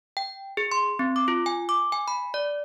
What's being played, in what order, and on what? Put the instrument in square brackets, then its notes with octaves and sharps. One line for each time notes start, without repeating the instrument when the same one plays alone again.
[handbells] G5
G#4
C6
C4
D6
F4
G#5
D6
G#5
B5
D5